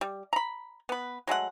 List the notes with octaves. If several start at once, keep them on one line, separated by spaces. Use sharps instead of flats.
G3
A#5 B5
B3 B4
F#3 G#3 A3 F#5